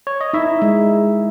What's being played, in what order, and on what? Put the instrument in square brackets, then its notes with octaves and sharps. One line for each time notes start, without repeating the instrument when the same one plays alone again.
[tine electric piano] C#5
D#5
[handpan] D#4 [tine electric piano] E4 E5
[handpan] G#3